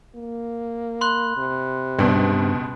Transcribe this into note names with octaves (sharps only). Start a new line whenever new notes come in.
A#3
B5 C6 F#6
C3
C#2 G2 B2